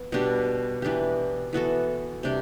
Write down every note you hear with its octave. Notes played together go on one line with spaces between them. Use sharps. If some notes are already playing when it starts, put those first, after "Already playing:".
Already playing: B3
B2 G3 D4 G4
E3 B3 D4 G4
E3 B3 F#4 A4
C3 G3 D4 G4